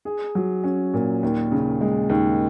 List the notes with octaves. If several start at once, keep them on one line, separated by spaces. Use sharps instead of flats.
G#4
F#3
C#4
A#2
D#2
C#3
G#3
D#2